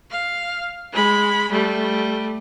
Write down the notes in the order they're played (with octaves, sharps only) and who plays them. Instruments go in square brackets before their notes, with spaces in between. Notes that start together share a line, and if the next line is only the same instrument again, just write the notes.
[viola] F5
G#3 B5
G3 A3